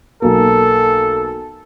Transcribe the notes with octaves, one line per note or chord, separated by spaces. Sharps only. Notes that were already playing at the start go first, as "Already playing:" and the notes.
B1 A#3 A4